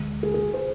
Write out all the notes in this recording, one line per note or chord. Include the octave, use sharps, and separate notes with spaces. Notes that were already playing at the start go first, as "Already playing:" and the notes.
Already playing: D2 D3 G#3
G#4
G#4
C5